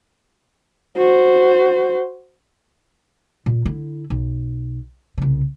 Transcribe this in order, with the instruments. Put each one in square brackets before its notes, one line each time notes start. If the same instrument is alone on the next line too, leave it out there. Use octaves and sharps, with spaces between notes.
[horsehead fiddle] F#4 C5
[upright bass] A#2
D3 E4
B1
C2 C#3